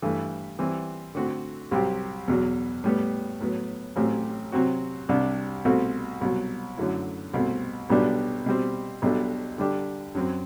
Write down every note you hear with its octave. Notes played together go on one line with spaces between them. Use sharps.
G2 E3 A3
E3 G3 C4 E4
D3 A3 C4 F#4
C2 C3 F#3 C4 G4
E2 B2 F#3
A2 G3 B3
A2 F#3 B3
A1 A2 F#3 C4 G4
C3 F#3 C4 F#4
C2 C3 G3 D4
C2 B2 A3 C4 F#4
C2 B2 F#3
F#2 D3 F#3 A3 E4
C2 B2 A3 C4
B1 B2 G3 B3 D4
B2 G3 C4
B1 B2 G3 D4 A4
D3 G3 D4 G4
F#2 F#3 C4